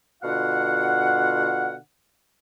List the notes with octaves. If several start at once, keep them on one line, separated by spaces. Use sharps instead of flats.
B2 D3 F4 F5 F#5